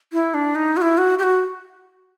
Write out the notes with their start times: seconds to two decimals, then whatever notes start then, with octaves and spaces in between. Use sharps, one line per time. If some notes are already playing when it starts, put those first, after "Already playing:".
0.13 E4
0.34 D4
0.55 D#4
0.77 F#4
0.82 E4
0.98 F#4
1.19 G4
1.23 F#4